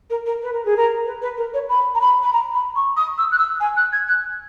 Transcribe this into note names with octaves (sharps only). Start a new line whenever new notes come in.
A#4
A#4
B4
A#4
G#4
A#4
B4
B4
A#4
C#5
B5
A#5
B5
B5
A#5
B5
C#6
D#6
E6
F#6
E6
G#5
F#6
G#6
F#6